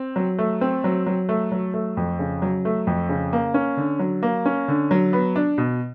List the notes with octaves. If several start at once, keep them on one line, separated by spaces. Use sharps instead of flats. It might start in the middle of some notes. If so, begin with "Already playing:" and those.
Already playing: C4
F#3
A3
C4
F#3
F#3
A3
F#3
A3
F2
C#3
F#3
A3
F2
C#3
A#3
C#4
D3
F#3
A#3
C#4
D3
F#3
B3
D4
B2